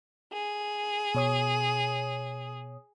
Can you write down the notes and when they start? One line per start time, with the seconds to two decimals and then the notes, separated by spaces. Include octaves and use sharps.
0.33 G#4
1.15 B2 C#5 D#6